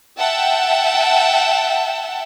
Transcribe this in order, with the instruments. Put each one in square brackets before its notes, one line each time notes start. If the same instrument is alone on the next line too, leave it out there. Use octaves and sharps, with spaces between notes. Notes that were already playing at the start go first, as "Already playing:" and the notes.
[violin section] E5 F#5 G5 A5